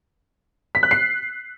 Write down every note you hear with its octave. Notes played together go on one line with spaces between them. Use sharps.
B6
F#6
C7